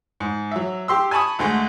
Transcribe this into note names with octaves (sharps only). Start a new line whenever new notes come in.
G#2
F#3 E5
G4 C6 E6
G#5 A5 B5 C#6 D#6
D2 D3 G#3 A3